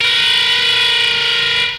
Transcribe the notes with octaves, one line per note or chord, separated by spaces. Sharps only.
A#4 B4